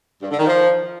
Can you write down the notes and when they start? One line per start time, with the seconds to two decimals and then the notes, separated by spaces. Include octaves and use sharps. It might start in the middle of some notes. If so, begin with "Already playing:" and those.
0.22 G2
0.31 D3
0.39 D#3
0.47 F3